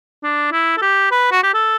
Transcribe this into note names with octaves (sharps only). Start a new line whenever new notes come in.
D4
E4
A4
G4
B4
F#4
G4
A4